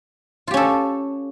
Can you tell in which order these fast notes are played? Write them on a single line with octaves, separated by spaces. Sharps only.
F4 G4 C#4 A4